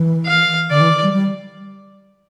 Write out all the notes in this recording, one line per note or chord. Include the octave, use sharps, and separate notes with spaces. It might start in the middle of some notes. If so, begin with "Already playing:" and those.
Already playing: E3
F5
D3 D5
E3
G3
G3